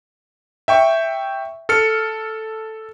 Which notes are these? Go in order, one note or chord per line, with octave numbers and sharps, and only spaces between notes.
E5 G5 C#6
A4 F6 C#7